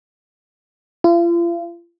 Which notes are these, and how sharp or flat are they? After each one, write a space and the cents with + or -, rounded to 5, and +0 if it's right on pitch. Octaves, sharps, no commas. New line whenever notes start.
F4 -40